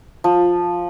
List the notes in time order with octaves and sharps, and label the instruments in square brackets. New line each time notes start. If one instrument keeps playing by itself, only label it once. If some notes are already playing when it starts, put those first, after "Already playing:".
[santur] F3